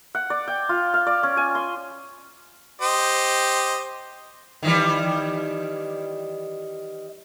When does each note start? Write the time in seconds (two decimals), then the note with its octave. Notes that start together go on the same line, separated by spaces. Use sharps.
0.15 F#5
0.30 D5
0.48 G5
0.69 F4
0.94 F5
1.07 D5
1.23 C#4
1.37 G#5
1.55 C6
2.82 G4 C5 D#5
4.63 D#3 E3 G3